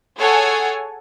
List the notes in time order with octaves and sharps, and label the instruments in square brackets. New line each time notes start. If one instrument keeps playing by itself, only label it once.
[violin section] G#4 A4 C#5 F#5 G#5